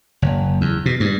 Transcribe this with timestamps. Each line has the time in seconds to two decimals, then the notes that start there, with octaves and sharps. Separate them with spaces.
0.22 F#1
0.61 E2
0.86 B2
1.00 G2